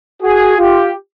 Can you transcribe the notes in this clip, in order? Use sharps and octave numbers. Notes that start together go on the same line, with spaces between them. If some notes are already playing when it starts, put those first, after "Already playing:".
F#4 G#4
F4 G4